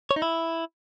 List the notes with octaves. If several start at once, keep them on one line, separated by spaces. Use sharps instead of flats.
C#5
D#4
E4